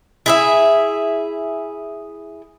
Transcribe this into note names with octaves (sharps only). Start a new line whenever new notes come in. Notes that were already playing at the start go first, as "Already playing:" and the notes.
E4 G#4 E5